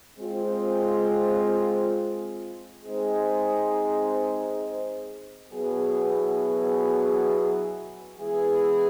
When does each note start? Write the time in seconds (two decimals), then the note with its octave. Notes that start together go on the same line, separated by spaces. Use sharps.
0.18 G#3 C4 F4
2.85 G#3 C4 D#4 G#4 C5
5.50 B2 F#3 B3 E4 G#4
8.18 E3 G#3 B3 E4 G#4